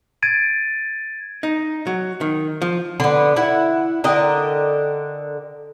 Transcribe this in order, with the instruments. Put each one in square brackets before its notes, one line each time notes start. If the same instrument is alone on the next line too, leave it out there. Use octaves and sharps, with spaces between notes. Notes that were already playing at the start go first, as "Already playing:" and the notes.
[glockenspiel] G#6 A6 D7 D#7
[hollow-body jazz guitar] D#4
F#3
D#3
F3
[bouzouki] D3 B3
E4 F#5
D3 A#4 D#5 G5